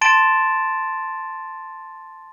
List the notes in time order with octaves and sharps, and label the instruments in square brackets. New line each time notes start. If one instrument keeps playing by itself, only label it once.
[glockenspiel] A5 C6 A6 D7 E7